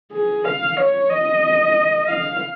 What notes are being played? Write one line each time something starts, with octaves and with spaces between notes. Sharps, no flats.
G#4
F5
C#5
D#5
F5